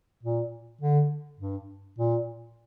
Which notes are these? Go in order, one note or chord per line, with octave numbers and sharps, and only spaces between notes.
A#2
D3
G2
A#2